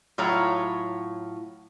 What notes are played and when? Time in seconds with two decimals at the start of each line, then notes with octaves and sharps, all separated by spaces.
0.18 A2 F#3 F4 C#5 A#5